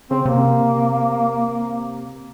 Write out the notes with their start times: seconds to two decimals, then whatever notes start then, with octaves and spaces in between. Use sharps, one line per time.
0.11 C#3 C4
0.26 C3 A#3